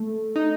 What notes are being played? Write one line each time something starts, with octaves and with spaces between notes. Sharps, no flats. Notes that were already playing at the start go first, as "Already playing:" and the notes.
Already playing: A3
D#4